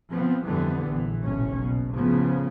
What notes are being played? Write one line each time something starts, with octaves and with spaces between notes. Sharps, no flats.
F3 B3 C4
F2 D3 E3 G3 B3
A#1 E3
F#1 B1 A2 C#4
B2
A2 C#3 F3 B3